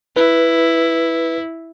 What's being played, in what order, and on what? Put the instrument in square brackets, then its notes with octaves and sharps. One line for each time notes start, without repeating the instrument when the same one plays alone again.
[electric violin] E4 [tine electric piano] B4